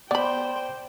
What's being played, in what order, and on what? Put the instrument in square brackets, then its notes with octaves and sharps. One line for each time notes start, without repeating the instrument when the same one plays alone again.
[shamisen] B3 B5 [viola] C5 G5 [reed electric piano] D5